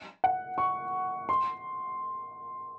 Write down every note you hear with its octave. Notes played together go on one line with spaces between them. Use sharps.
F#5
C#6
C6